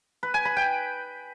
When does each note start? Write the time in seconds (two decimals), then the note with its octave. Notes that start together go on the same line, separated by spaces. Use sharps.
0.23 B4
0.34 G#5
0.45 B5
0.56 G5